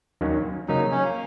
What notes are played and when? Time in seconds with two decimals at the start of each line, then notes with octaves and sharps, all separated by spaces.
0.21 D#2 D#3 F#3 A#3 C#4
0.68 C#3 F#3 A#3 C#4 D#4
0.92 C#4
1.04 A#3